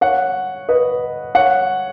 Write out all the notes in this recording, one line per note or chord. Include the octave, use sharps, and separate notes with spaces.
C#5 F#5
B4 D#5
C#5 F#5